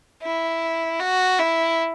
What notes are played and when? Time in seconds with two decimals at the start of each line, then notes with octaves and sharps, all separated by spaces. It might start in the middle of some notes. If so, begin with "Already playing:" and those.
0.22 E4
1.00 F#4
1.39 E4